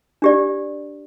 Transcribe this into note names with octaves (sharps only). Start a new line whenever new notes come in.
D4 G4 D5